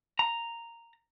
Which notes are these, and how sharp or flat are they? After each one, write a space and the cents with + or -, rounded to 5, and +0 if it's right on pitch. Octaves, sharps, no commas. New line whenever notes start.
A#5 -5